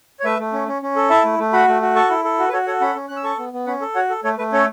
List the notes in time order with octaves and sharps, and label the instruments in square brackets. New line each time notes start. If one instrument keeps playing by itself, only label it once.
[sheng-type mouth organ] C#5
A3 B4 E5
A3
C#4
C#4
C#4
A4
E4 E5 A5
A3
A3
F#4 F#5 B5
A3
F#4
A4 A5 C#6
E4
A4
F#4
B4
F#4 A4 C#5
A4 C#5 F#5
C#4 F#5 B5
C#4
C#4 F#6
E6
A4 A5 C#6
B3
B3
C#4 F#5 B5
A4
F#4 C#5 F#5
A4
A3 A4 C#5
A3 B4
C#4 A4 C#5